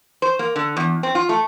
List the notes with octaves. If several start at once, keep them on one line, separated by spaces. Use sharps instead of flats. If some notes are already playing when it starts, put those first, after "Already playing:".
C5
A#3
D3
E2
C4
F4
A3